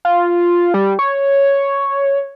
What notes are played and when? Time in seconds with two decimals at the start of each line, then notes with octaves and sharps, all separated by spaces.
0.05 F4
0.74 G3
0.99 C#5